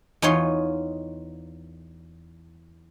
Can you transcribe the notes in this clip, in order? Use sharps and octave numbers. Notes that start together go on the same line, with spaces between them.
E2 D#4 F4 C#5 C6